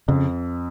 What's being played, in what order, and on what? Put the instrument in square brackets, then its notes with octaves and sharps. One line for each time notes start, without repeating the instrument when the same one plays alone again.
[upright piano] F2 [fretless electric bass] C#3